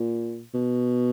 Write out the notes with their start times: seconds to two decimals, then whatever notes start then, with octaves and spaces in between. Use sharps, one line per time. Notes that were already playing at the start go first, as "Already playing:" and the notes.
Already playing: A#2
0.54 B2